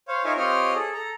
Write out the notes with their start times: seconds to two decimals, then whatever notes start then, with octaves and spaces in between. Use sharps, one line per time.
0.08 C5 C#5 F5
0.24 D#4 F4 A#4 C#5 E5 G#5
0.37 C4 F4 G4 C#5 D#5 F6
0.75 G#4 A4
0.94 A4 A#5